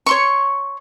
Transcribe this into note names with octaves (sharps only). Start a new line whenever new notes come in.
C#5 C6 C#6